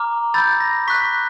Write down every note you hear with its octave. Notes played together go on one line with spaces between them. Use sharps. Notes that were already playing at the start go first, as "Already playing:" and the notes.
Already playing: A#5 D6 F6
B5 E6 G6 A6
A#6
C#6 F#6 B6